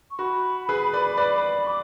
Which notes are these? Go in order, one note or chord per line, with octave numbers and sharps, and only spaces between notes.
C#6
F#4 B5
G#4 B4
B4 D5
B4 D5
D6